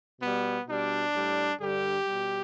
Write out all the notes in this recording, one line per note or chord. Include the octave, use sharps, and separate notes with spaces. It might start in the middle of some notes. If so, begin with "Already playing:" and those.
B2 G3 B3
B2 G3 D4
A2 G3
G2 D3 G3 G4
B2 G3